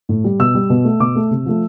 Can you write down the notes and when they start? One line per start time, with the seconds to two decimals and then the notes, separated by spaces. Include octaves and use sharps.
0.09 A2
0.24 G3
0.39 B2 E6
0.55 G3
0.70 B2
0.85 A3
1.00 B2 D6
1.15 A3
1.31 C3
1.46 F3 A3